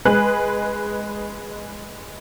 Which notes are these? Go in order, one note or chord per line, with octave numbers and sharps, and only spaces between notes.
G#3 G#4 B4 F#6